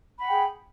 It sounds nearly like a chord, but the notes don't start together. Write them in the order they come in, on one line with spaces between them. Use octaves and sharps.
B5 F#5 G5 G#4